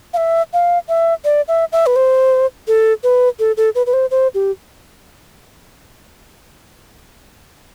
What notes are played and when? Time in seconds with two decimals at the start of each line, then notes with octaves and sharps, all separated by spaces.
0.14 F5
0.17 E5
0.53 F5
0.89 E5
1.25 D5
1.48 E5
1.72 E5
1.86 B4
1.96 C5
2.68 A4
3.04 B4
3.39 A4
3.57 A4
3.75 B4
3.86 B4
3.93 C5
4.11 C5
4.34 G4